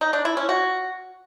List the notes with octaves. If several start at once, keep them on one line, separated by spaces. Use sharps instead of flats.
D#4
D4
E4
C#4
F#4